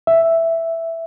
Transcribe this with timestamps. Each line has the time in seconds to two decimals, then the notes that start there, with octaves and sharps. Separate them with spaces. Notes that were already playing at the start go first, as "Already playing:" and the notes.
0.07 E5